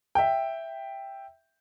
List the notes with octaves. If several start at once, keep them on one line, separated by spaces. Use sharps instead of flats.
E5 G5